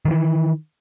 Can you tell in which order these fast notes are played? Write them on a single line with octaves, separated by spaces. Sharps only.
D#3 F#3 E3